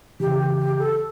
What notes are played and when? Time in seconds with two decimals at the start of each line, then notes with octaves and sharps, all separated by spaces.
0.20 C#3 E3 G4
0.40 G4
0.58 G4
0.79 A4